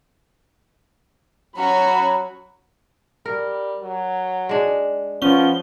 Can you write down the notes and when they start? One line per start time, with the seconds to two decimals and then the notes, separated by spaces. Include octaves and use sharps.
1.56 F#3 C#4 F#4 B5
3.26 G3 A#4
3.83 F#3
4.49 G#3 D4
5.22 F3 B3 C#4 G7